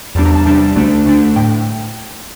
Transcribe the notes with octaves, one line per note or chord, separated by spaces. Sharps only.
E2 C3 G3 D4 A5
A#5
A5
E2 C3 G3 D4 A5
D2 D3 A3 D4
D2 D3 A3 D4
A2 G5